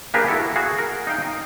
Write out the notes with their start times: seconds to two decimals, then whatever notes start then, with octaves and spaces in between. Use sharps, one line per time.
0.14 A#3 D4 G4 G#4 A#4 B4
0.28 E4 F#4 A4
0.56 F#4 G#4 F5
0.78 A#4
1.07 D#4 F5 G5
1.22 D#4